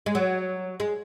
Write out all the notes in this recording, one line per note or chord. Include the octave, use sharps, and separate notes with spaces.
G#3
F#3
G#3